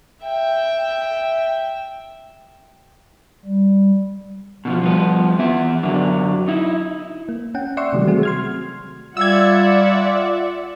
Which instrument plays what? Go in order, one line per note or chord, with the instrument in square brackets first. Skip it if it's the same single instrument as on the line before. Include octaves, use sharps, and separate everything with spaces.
[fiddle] E5 G5
[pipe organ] G3
[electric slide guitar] B2 D#3 F3
F3 G3 B3
E2 B3 E5
F#2 D3 F#3
D#4 E4
[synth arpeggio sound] A#3
C#4 F#5 G5
D5 E5 F#5 C6 C#6 E6
C3 D#3 E3 F#3 G3 A3
A3 C4 F#4 G#4
C6 F6 G#6
[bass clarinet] G3 [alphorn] F4 [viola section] D5 E5 F#5 [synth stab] E6 G#6